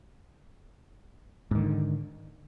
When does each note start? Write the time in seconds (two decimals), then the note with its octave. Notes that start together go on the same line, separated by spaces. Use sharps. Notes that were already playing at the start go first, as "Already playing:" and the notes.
1.51 G#2
1.55 D#3
1.59 D3